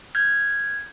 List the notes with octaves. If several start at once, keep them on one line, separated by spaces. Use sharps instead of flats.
F6 G6 G#6